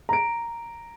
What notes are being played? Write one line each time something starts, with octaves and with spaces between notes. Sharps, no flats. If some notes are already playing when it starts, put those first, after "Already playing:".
A#5 D7